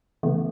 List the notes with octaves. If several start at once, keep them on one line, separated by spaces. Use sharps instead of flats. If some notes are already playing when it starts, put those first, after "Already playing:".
C#3 E3 A3 B3